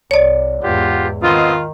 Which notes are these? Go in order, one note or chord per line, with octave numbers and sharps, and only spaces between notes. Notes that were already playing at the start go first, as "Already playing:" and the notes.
C2 C#5 D5
E2 G#2 F4 G4 F#5
D#3 B3 C4 F4 D#5